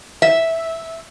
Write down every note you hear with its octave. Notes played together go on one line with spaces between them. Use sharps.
E5